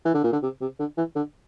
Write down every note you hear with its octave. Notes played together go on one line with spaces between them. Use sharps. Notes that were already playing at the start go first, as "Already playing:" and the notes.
E3
D3
A#2
D3
C3
C3
D3
E3
D3